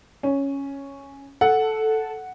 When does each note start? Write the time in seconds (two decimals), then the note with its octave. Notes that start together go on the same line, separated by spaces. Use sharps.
0.23 C#4
1.41 A4 F#5